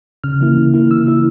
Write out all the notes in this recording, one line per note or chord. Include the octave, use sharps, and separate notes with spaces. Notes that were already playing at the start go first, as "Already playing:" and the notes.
C#3 F6
E3 A#3 E4
C#3
E3 A#3 E4
C#3 E6
E3 A#3 E4